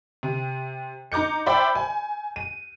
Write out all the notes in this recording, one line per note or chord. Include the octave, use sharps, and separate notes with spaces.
C3
D#4 A#5 D6 G6 C#7
C5 D5 E5 G5 B5
G#5
D#7